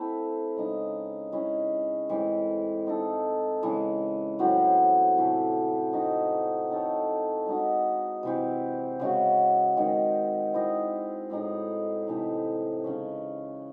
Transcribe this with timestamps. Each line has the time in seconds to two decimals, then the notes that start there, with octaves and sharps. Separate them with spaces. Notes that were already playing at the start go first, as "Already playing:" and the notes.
Already playing: A3 C4 E4
0.56 C#3 G#3 D#4
1.32 G#3 C#4 E4
2.09 A2 E3 G#3 C4
2.86 C4 D#4 A4
3.63 C#3 E3 G#3
4.39 A2 F#3 C4 F#4
5.16 C3 E3 A3
5.93 A3 C4 D#4 F#4
6.70 C4 D#4 A4 C#5
7.46 G#3 D#4 F#4
8.23 C3 E3 C4
9.00 C#3 G#3 C#4 F#4
9.77 D#3 G#3 C4
10.54 C4 E4 G#4 D#5
11.30 A2 G#3 D#4 G#4
12.07 C3 E3 A3 D#4
12.84 C#3 G#3 C#4